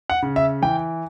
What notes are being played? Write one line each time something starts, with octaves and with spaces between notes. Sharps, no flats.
F#5
C#3
E5
E3 G5